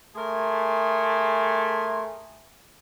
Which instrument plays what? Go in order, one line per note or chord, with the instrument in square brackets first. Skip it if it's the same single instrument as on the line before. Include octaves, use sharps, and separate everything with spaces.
[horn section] A3 G#4 A#4 G#5 C6